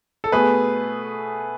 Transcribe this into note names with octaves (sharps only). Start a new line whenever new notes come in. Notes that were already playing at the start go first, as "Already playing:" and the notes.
A4
B2 A3 G#4 B4